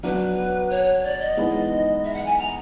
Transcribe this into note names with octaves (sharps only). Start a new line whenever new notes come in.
F#3 B3 D4 F#4 B4
C#5
D5
D#5
E3 G#3 B3 D#4
E5
F#5
G#5
A#5